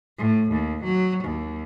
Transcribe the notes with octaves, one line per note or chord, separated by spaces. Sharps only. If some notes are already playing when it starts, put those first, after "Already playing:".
A2
D#2
F#3
D#2